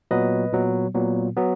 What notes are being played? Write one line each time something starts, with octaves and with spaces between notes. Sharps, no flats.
A#2 F#3 B3 B4 D#5
A#2 F#3 B3
A#2 F#3 B3
F#3 B3